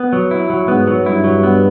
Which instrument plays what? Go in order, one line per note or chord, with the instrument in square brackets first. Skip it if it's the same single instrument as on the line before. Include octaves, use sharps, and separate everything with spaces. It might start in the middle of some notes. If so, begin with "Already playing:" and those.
Already playing: [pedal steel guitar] B3
F#3
E4
F#3
[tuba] G#2 [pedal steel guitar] B3
[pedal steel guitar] F#3
[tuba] G2 [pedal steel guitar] E4
[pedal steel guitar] F#3
B3